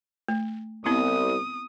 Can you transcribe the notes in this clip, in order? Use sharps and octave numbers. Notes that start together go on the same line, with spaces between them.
A3
C2 B3 C4 E4 D#6